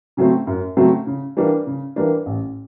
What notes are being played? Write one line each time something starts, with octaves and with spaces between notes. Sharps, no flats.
C#3 F#3 A3 C4
F#2
C#3 F#3 A3 C4
C#3
E3 G3 A#3 D4
C#3
E3 G3 A#3 D4
A1